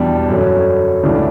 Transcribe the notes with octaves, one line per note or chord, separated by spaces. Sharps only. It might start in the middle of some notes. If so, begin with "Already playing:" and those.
Already playing: E2 B2 G3 D4
F#2 D3 F#3 C#4
C#2 C#3 E3 A3 D4